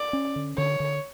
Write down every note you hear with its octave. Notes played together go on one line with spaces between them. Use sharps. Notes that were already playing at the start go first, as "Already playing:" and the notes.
Already playing: D5
C#4
D3
D3 C#5
D3